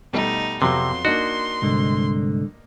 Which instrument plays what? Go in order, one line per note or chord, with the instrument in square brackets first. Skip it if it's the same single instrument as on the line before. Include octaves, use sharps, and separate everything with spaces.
[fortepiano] B2 G3 A3 [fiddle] D#4
[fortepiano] F2 F#3 B3 [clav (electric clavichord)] C3 [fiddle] C6
[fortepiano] A#3 D4 D#4 [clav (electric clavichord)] F#4
[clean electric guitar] C2 G#2 D3